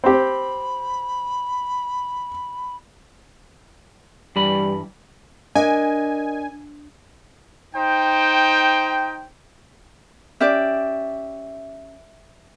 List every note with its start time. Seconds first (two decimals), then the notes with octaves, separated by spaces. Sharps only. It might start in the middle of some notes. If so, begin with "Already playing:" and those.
0.04 C4 G4 B5
4.36 G2 E3 G3 B5
5.55 D4 A#4 D#5 G#5
7.75 D#4 C5 G5
10.40 C#4 G4 D5 E5